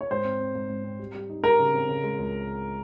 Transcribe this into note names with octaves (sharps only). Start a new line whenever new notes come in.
C#5
G#2 C5
C4
C4
G#2
G#2
C4
G3
G3
D#4
G3 A#4
C#3
C4
C#3
G#3
C#2